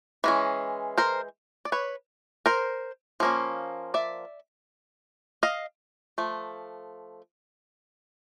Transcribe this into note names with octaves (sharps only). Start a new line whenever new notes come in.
E3 G#3 C#4
A#4 C5
D5
B4 C#5
A#4 C5
F3 A#3 C#4
D5 E5
D#5 F5
F3 A3